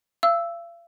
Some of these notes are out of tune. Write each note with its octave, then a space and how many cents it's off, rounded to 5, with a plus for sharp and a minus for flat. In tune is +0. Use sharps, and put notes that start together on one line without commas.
F5 -40 E6 +0